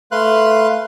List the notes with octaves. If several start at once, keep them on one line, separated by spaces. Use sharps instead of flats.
A3 B4 F5 C6 F#6